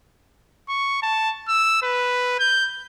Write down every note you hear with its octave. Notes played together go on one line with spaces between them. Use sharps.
C#6
A5
E6
B4
G6